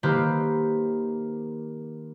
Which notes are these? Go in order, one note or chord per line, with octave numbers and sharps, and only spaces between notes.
D#3 A#3 G4 B4 C5